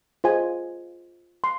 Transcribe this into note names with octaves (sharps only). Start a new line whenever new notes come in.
F4 G#4 C5 D#5 G#5
C6